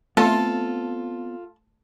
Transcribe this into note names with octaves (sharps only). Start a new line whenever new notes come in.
A3 B3 C4 F4 A4 A5